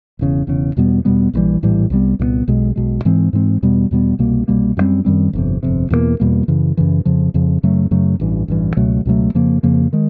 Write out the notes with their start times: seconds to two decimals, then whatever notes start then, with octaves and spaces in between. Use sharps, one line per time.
0.19 E1 E2 C#3
0.47 E1 E2 C#3
0.77 E2 B2 G3 B3
1.05 E2 B2 G3 B3
1.34 A#1 A2 E3 G3
1.62 A#1 A2 E3 G3
1.90 C2 A#2 G3 B3
2.19 C2 A#2 G3 B3
2.48 B1 B2 G#3
2.76 B1 B2 G#3
3.05 G#2 E3 G#3 C4
3.33 G#2 E3 G#3 C4
3.62 E2 B2 G3 B3
3.91 E2 B2 G3 B3
4.19 C2 B2 G3 A#3
4.48 C2 B2 G3 A#3
4.77 F#2 D#3 G3 C4
5.05 F#2 D#3 G3 C4
5.33 G1 F2 C3
5.63 G1 F2 C3
5.90 E2 B2 G3 A#3
6.20 E2 B2 G3 A#3
6.48 F#2 C#3 E3
6.77 F#2 C#3 E3
7.05 F2 C#3 F3
7.34 F2 C#3 F3
7.63 F#2 C#3 F#3 A3
7.91 F#2 C#3 F#3 A3
8.20 A1 G2 E3
8.48 A1 G2 E3
8.77 C#2 B2 F#3 A3
9.05 C#2 B2 F#3 A3
9.34 F2 C#3 F3 A#3
9.63 F2 C#3 F3 A#3
9.93 D#3 G#3